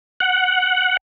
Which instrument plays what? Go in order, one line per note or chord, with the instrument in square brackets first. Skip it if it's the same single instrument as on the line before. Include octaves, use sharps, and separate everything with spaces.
[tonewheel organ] F#5